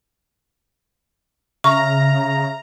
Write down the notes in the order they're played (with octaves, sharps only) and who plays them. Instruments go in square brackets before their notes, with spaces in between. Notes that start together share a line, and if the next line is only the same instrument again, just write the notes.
[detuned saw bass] C#3 [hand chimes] E5 F6 A#6 [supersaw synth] A#5 [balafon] C#6